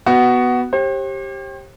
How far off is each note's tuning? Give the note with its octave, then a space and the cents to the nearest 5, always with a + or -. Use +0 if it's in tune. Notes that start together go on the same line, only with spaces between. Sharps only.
B3 +0 F#4 +10
G4 +0 C5 +45